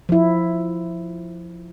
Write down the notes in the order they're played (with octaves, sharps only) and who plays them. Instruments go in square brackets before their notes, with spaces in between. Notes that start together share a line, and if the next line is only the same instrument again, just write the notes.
[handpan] F3 E4